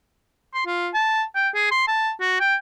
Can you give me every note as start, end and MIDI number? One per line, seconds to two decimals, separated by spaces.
0.54 0.63 84
0.66 0.89 65
0.94 1.24 81
1.35 1.49 79
1.55 1.71 68
1.71 1.83 84
1.88 2.11 81
2.21 2.40 66
2.40 2.56 79